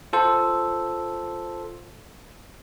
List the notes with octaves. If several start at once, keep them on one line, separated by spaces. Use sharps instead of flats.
F4 A4 C5